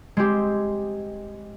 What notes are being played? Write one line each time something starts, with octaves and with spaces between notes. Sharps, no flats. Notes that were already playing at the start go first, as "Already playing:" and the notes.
G#3 C4 G4